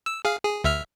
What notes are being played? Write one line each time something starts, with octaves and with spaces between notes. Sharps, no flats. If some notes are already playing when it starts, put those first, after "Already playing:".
E6
G#4 F5
G#4
D2 E5 F6